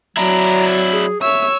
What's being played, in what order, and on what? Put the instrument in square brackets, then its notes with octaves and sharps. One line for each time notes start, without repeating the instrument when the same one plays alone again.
[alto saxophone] F#3 [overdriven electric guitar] D4 E4 [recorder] A#5
[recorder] G#4
[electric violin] C#5 E6 [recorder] E5